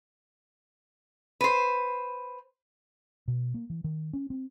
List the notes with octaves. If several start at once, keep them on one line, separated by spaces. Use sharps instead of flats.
B4 C5
B2
A#3
E3
D#3
C#4
C4